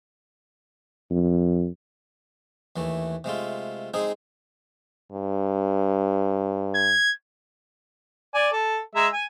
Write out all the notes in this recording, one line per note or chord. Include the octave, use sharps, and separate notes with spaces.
F2
D#2 E3 A3
C3 G#3 A3 F4
G#3 C4 D#4 G#4
G2
G#6
D5 G#5
A4
G#3 E5 A#5
G#5